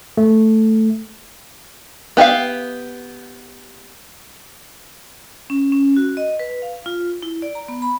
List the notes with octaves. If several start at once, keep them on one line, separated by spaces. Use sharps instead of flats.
A3
B3 G4 E5 F5
C#4
C#4
F#4
D#5
B4
F5
F4
E4
D5
A#5
B3
B5